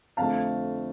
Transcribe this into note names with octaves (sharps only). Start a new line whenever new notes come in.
F2 D3 A3 F5 A5